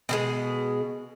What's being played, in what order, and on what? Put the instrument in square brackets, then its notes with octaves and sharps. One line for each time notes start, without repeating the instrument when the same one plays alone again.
[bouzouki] B2 F#3 G#3